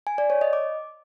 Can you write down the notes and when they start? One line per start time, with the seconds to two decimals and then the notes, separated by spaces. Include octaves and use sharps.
0.07 G#5
0.18 D5
0.30 C#5
0.41 D#5
0.53 D6